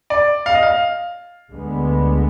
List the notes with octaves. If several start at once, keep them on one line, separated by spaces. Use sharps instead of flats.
D5
F5
D#5
F5
D2 D3 G#3 B3